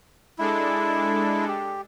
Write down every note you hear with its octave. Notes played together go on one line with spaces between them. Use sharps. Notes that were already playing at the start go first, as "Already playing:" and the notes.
G#3 D4 E4 A4
G4